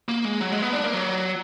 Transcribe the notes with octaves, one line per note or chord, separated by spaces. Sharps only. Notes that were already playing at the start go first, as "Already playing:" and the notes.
A#3
G#3
F#3
G#3
B3
D4
A#3
F#3